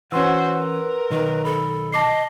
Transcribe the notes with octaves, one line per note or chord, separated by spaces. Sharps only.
E3 C#4 F#4 B4 C5 F#5 C6 E6
A#4
B1 D#3 B4
A4 B5
D#5 A5 D6 C7